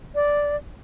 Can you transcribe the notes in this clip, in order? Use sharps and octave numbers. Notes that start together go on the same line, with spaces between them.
D5